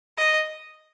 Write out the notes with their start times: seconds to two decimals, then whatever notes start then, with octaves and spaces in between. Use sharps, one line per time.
0.17 D#5